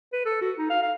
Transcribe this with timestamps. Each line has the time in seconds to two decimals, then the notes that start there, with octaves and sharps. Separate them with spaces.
0.13 B4
0.25 A4
0.41 F#4
0.58 D#4
0.70 F5
0.83 F5